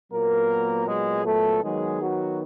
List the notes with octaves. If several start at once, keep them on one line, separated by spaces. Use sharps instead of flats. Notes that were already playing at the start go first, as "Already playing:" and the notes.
A#2 F#3 A#3 B3 A#4
G#3 G#4
A3 A4
D#3 F#3 G#3 B3 G#4
F#3 F#4